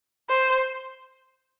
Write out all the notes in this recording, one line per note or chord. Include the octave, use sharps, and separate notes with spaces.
C5